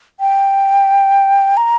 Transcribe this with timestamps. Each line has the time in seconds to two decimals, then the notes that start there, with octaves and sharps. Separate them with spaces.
0.20 G5
1.57 A#5